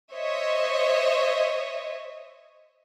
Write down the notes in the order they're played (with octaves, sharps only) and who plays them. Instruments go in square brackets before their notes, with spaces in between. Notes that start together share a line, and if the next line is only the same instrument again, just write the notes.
[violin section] C5 C#5 D#5 E5